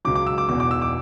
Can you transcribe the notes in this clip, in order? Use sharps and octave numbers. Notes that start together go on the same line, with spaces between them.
C#2 C#3 F#3 D6
D6
E6
D6
E1 E2 B2 D6
D6
E6
D6